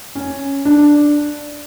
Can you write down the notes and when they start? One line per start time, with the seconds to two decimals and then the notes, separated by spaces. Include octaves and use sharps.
0.15 C#4
0.65 D4